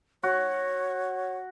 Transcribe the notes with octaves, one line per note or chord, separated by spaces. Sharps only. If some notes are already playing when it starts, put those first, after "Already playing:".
F#4 C#5